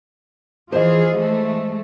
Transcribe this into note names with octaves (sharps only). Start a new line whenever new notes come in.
E3 F4 G#4 C5 D#5
E3 G#3 A3